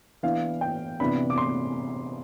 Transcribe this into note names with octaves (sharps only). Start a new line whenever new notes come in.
E3 B3 D4 F5
G5
C3 E3 B3 D4 B5
D6
C6